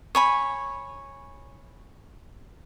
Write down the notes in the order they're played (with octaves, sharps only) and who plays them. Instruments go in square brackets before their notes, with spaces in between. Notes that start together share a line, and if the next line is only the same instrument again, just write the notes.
[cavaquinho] C#5 G#5 B5